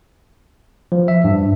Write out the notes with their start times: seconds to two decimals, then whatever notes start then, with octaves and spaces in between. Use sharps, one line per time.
0.92 F3
1.08 E5
1.24 G2